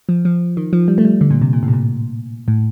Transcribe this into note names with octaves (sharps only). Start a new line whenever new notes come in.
F3
F3
D#3
F3
G3
A3
G3
D3
A#2
C3
A#2
A2
C3
A#2
A2